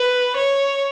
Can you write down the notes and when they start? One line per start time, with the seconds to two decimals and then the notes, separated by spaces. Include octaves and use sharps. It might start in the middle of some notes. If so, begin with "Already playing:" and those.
Already playing: B4
0.36 C#5